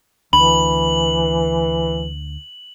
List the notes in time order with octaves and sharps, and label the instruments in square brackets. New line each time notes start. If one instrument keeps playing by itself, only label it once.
[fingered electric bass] D2 [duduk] E3 [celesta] B5 [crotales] F#7